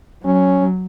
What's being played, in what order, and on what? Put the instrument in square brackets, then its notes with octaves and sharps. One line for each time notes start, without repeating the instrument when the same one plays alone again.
[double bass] F#3 [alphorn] C#4